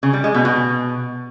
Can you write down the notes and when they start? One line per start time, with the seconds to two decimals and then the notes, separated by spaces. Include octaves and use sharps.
0.03 C#3
0.13 G3
0.24 G#3
0.34 B2
0.45 B2